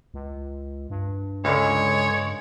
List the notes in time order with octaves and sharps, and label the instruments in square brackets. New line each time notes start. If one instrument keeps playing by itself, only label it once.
[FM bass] C#2
G2
[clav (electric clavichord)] C#2 D3 [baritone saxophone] G#3 [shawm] C#5